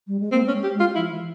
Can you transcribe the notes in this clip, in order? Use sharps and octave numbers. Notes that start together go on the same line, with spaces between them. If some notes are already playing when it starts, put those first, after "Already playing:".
G3
G#3
A#3 C4
C#4
G#3
G4
G#3
F4
F3 E4
E3